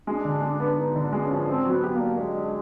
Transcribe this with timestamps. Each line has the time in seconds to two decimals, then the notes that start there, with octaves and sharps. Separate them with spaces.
0.07 G#3 D4
0.25 D3
0.42 G#3
0.60 B3
0.77 B3 D#4
0.96 D3 D4
1.13 G#3
1.25 C#4
1.31 F3
1.47 C4 D4
1.65 F#3
1.71 B3
1.84 G4
1.95 A#3
2.00 D4
2.18 G#3 D4
2.37 D4